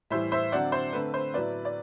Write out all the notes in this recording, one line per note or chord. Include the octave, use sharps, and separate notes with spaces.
A2 E3 G3 C5 E5
C5 E5
D3 F#3 C4 D5 F#5
C5
D3 A3 C4 B4
C5
A2 F#3 B3 B4 D5
D5